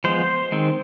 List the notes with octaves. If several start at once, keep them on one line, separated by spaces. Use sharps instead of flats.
F3 G#3 B3 C5
D#3 G#3 C4